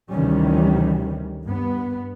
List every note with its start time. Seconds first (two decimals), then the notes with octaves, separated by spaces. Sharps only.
0.11 D2 C3 D#3 E3 G3 C#4
1.45 G2 B3